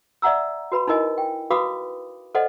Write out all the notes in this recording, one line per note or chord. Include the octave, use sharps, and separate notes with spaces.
D5 E5 F#5 A#5 E6
F#4 B4 B5
D#4 E4 A#4 D#5 G#5
G5
F#4 B4 F5 B5 D6 D#6
A4 C5 D5 D#5 F#5